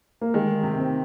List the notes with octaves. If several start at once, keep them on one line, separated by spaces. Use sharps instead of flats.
A#3
D#3 G#3
C3
C4